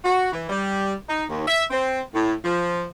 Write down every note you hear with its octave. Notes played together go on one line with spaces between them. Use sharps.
F#4
E3
G3
D#4
D#2
E5
C4
A2
F3